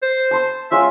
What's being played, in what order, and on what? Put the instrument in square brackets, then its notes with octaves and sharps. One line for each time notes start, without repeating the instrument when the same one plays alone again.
[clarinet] C5
[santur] A5 C6 E6
[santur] G#3 C#4 F4 [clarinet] E5